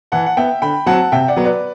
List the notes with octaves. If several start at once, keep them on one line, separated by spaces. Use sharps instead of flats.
E3 F#5 A5
F#5
B3 E5 G5
D3 G5 B5
F#3 C4 F#5 A5
C3 E5 G5
D5 F#5
F#3 B3
B4 D5